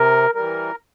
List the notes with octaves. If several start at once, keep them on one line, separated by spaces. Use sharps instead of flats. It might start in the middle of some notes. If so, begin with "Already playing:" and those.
Already playing: C3 A#4
E3 G3 A#4